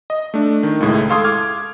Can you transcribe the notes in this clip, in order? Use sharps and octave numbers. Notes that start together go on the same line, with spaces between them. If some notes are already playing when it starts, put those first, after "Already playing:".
D#5
A3 D4
D#3
C#2 A2 G#3
A4 F5 C6 C#6 D#6 G#6
D6 F6 G#6